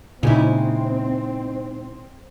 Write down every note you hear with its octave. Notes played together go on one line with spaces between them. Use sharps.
A#2 C#3 G#3 C4 D#4 E4